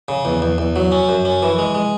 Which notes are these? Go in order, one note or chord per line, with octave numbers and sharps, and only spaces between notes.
C#3
E2
E2
E2
F#3
C#4
F#2
C#4
E3
G#3
G#3